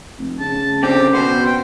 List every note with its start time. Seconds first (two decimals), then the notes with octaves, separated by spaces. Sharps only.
0.18 F1
0.40 C#3 A5
0.83 D3 C4 G4
1.13 B2 B3 C5
1.46 G5